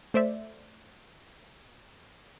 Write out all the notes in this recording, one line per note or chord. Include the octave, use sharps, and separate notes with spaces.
A3 C5 D5 E5